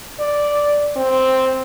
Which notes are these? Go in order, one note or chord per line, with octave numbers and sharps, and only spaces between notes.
D5
C4